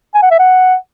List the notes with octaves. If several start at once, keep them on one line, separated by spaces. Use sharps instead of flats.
G#5
F#5
E5
F#5